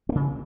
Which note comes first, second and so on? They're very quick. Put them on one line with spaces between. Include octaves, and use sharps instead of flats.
C4 A#3 C#3